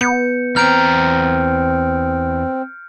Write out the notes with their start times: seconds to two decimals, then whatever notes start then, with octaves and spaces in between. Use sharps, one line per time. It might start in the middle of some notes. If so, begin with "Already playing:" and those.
0.01 B3 G6 C#7
0.56 E2 C4 A#5 F6 G6 D7